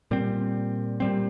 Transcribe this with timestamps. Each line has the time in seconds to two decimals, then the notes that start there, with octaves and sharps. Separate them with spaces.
0.11 A#2 G3 C4
1.00 A#2 G3 C4